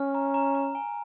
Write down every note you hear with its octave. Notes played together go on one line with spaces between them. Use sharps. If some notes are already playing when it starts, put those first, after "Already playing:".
Already playing: C#4 F6
A#5
A#5
A#5
G#5